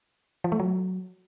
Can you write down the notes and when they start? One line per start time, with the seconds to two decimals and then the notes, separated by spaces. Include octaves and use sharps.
0.44 F3
0.52 A3
0.60 F#3